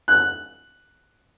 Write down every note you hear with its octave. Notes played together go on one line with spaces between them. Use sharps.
F#6